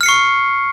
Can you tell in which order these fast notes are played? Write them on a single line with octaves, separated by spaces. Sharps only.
F6 C#7 C7 C#6